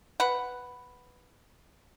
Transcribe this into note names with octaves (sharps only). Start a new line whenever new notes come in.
B4 F#5